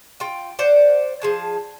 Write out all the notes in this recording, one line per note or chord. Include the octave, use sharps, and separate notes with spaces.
F4 G5
C5 D5 F#5
F3 G#4 A5